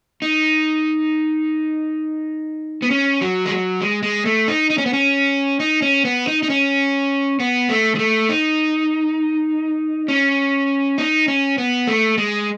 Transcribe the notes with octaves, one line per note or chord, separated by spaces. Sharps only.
D#4
B3
C#4
F#3
G#3
F#3
G#3
G#3
A3
D#4
D#4
C#4
B3
C#4
D#4
C#4
B3
D#4
D#4
C#4
B3
A3
G#3
A3
D#4
C#4
D#4
C#4
B3
A3
G#3